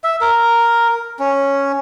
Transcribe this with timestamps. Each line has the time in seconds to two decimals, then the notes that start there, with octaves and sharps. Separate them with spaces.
0.04 E5
0.21 A#4
1.19 C#4